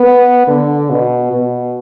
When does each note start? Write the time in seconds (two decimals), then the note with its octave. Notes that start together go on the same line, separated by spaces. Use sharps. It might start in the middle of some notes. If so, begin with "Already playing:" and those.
Already playing: B3
0.47 D3
0.90 B2
1.32 B2